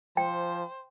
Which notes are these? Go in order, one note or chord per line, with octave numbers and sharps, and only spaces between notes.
F3 C5 G5